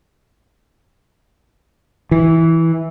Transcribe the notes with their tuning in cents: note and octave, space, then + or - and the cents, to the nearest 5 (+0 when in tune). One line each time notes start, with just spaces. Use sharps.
E3 -10